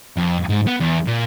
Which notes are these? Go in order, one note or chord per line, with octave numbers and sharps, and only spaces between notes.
F2
G#2
B3
E2
A#2